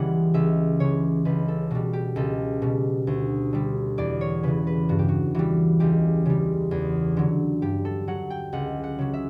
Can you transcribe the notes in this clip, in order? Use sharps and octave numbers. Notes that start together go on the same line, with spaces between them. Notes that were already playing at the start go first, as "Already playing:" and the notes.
Already playing: C#2 C#3 E3 G3 F#5
C#2 E5
C#3 E3 C#5
C#2 B4
A4
B2 G3 F#4
G4
C#2 A4
B2 G3
D2
D3 G3
E2 D5
C#5
C#3 E3 B4
B4
G2 F#4
G4
F#4
E3 G3 F#4
C#2 G4
C#3 G3
E2
D3 F#3
G2 G4
A4
F#3 F#5
G5
C#2 F#5
F#5
C#3 F#3
E5